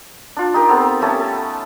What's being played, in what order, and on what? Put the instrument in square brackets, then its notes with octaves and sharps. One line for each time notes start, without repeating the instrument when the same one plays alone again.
[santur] D4 F4
D#4 G4 A#4
B3 C4 A4 A#4
G3 A3 C#4 A5
A4